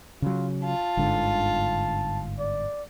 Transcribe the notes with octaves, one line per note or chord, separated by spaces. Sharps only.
C#3 F#3 F4
F4 A5
G1 G#2 D3
D5